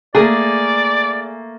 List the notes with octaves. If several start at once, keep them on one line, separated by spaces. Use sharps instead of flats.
A3 A#3 G#4 D5